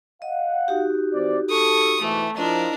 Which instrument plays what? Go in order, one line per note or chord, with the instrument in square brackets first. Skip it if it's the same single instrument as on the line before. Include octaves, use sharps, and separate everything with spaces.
[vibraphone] D#5 [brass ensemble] F5 F#5
[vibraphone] D#4 F#4 G4
[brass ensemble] E3 C4 D5
[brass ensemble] A4 [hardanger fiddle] C#6 D#6
[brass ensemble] G#2 B2 E3 [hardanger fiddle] A3
[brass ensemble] F3 [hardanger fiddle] D4 A#4 [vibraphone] E4 D#5